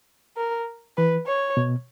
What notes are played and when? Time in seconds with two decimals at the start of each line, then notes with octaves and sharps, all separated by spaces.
0.37 A#4
0.97 E3 B4
1.27 C#5
1.57 B2